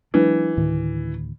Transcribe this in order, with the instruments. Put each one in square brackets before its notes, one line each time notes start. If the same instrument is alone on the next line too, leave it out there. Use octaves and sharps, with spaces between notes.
[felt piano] E3 [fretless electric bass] F#3 G#3 D4
[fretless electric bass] D2 A2 D#3